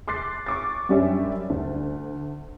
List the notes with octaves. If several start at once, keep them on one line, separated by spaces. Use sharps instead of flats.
C6 D6 F#6 A6 C7
C#6 D6 A6
F#2 G3 C#4 D4 G4 E5
D2